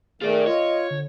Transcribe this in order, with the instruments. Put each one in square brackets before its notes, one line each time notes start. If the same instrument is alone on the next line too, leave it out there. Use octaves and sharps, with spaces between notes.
[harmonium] D#3 A3 [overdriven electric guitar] F4 D5 [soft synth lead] G#4
[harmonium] F4 [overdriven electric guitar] C#5 [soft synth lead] D#5
[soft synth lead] D3